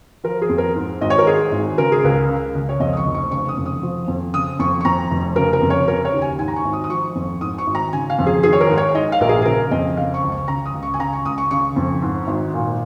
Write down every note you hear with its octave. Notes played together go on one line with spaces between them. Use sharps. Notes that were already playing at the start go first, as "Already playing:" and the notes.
F3 A#4
G#4
F2
A#4
G#2
G#1 D#5
C#5
A#4
G#2 G#4
G#1
C#3 A#4
G#4
C#2 A#4
C#3
C#2
C#5
F2 D#5
D#6
C#6
F1
C#6
C#3 C#6
D#6
F2
D#6
F3
F2
C#3 D#6
F2 C#6
C#6
F2 A#5
F1
C#3 A#4
A#4
F2
C#5
C#3 A#4
C#5
D#2
G#5
G#2 G#5
A#5
C#6
G#1
D#6
D#6
F3 C#6
F2
G#2 D#6
C#6
G#1
A#5
C#3 G#5
F5
F2
G#4
D#3 G#4
C#5
A#4
G#2
C#5
G#2 D#5
F5
A#1 A#4
G#4
G#4
C#3 A#4
F2 D#5
C#3 F5
C#6
C#2
C#6
C#3 A#5
D#6
C#2
C#6
G#5
C#3 A#5
C#6
C#2 D#6
C#6
C#3 C#6
F2
G#2
G#1
A#2